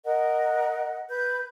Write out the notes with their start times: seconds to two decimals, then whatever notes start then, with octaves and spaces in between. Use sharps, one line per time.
0.04 A#4 D#5 F#5
1.09 B4 G6